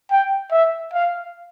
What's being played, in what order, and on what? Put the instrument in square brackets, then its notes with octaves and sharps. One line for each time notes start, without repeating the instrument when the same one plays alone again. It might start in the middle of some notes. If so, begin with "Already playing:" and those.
[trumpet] G5
E5
F5